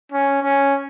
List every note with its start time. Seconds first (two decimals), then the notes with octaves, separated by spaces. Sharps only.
0.12 C#4
0.43 C#4